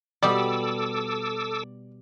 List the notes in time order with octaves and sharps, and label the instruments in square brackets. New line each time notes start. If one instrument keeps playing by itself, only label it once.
[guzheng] B2 G3 G4 [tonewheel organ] A4 D6 E6 [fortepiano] D5